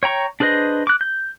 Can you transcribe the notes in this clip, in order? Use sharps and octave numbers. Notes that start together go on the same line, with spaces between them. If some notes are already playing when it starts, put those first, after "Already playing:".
C#5 G5 A#5 C#6
D4 G#4 B4 C5 D#5
D6 F#6
G6